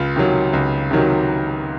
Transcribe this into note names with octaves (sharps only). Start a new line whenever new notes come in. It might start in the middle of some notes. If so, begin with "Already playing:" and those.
Already playing: C#2 F4
C3 D#3 F#3
C#2
C3 D#3 F#3